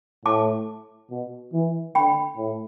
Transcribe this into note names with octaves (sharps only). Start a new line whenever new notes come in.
A2 A5 D6
B2
E3
D3 G5 B5
A2